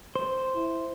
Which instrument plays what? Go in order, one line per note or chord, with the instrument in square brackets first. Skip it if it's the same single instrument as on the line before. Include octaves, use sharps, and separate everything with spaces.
[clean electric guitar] C5
[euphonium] E4